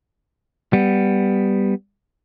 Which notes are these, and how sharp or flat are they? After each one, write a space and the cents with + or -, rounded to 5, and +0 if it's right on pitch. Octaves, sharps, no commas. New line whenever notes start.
G3 +0 B3 +0